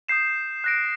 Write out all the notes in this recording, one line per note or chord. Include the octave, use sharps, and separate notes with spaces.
D#6 G6 C7 E7
F#6 A#6 D7